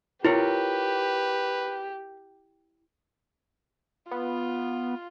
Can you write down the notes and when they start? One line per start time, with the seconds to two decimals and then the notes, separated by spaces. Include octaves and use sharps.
0.25 E4 F4 G4 A#4 B4 C#5
4.11 B3 F4